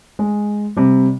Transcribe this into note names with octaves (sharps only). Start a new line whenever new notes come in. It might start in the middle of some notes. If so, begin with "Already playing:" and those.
G#3
C3 G3